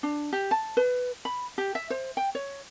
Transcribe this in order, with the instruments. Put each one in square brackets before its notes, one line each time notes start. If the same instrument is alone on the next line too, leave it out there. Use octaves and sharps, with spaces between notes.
[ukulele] D4
G4
A5
B4
B5
G4
E5
C5
G5
C#5